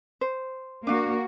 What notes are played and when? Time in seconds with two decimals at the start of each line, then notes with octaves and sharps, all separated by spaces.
0.21 C5
0.87 A#3 D4 F#4 F5